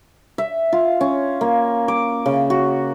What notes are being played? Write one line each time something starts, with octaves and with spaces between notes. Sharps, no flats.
E5
F4
C#4
A#3
D6
C#3
F#4